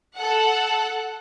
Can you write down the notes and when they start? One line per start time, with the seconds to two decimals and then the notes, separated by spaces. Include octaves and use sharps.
0.16 A4 F#5